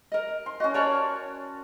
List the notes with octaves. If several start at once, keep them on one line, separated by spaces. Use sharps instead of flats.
A#4 D#5
C6
C#4 F#4 D#5
A#4 C#5 D5 A5